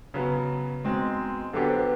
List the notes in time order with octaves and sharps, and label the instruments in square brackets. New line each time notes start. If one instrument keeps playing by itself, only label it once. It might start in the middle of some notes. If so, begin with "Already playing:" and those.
[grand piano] C#3 F#3 B3
B2 G#3 C4 D#4
[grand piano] D3 F#3 B3 D4 G4 [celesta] A4
[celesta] C5
B4